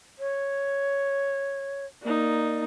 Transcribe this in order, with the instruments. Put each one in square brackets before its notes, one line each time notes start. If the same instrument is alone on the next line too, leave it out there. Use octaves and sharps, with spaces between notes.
[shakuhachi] C#5
[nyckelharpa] A#3 D#4 [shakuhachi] D5